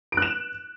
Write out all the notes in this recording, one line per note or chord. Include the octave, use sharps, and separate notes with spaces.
F#6 D7 E7